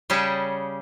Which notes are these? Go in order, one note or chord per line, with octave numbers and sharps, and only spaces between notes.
C#3 G3 C#4 G#4 G5 A5